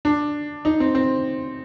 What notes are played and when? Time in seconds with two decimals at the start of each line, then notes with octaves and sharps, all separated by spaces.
0.05 D4
0.65 D#4
0.80 C4
0.95 C4